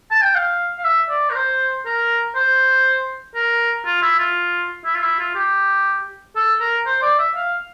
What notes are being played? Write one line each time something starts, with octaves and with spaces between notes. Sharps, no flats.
A5
G5
F5
F5
E5
D5
A#4
C5
A#4
C5
A#4
F4
E4
F4
E4
F4
E4
F4
G4
A4
A#4
C5
D5
E5
F5